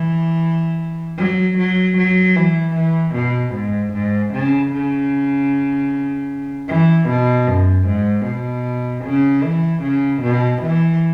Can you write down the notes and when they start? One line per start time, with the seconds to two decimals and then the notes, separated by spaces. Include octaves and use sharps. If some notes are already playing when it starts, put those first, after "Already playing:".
Already playing: E3
1.18 F#3
1.58 F#3
1.98 F#3
2.36 E3
2.75 E3
3.15 B2
3.54 G#2
3.93 G#2
4.34 C#3
4.72 C#3
6.68 E3
7.09 B2
7.47 F#2
7.87 G#2
8.26 B2
9.05 C#3
9.43 E3
9.83 C#3
10.22 B2
10.62 E3